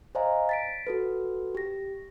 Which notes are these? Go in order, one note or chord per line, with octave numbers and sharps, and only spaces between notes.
C5 D5 D#5 F5 G#5 A#5
A6 B6 D7
F#4 A4 B4
G4 A#6